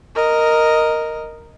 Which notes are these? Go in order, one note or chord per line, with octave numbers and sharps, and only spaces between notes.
A#4 D#5